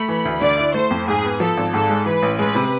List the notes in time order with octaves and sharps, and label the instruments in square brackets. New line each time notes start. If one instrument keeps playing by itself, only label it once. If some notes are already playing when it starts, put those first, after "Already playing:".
Already playing: [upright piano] A3 [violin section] B5
[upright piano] E3
D2
[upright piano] D3 [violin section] D5
[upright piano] E4
[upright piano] A3 [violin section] C5
[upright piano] F2
[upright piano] G#2 [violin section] G#4
[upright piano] B3
[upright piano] F3 [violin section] A4
[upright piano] G#1
[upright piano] G#2 [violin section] A4
[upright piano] G#3
[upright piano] E3 [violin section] B4
[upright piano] A1
[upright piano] G#3 [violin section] B4
[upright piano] C3